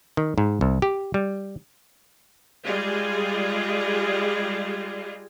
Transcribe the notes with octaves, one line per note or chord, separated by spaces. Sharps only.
D#3
G#2
C2
G4
G3
G3 G#3 F4 G#4